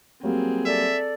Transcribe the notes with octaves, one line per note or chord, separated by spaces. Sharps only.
F#3 G3 A#3 C4 G#4
A4 D5 E5